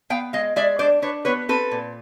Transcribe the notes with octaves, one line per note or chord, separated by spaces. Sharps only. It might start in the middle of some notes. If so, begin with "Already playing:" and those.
B3 F5 G5
G#3 D#5 F5
G#3 D5 E5
D4 C5 D5
D4 B4 C#5
B3 B4 C#5
C4 A4 B4
A#2